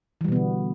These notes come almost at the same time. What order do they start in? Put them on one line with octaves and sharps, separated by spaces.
E3 G3 B2 B3 D3